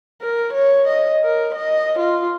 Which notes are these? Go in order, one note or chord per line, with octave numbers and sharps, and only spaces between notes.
A#4
C#5
D#5
A#4
D#5
F4